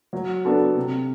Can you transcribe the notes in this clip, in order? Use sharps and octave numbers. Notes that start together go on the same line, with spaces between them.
F#3
B3 D4 F#4 A4
C3